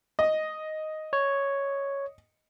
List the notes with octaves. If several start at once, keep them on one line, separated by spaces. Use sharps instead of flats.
D#5
C#5